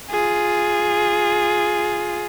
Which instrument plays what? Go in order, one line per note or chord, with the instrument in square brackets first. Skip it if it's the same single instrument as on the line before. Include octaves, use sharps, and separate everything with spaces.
[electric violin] F4 G#4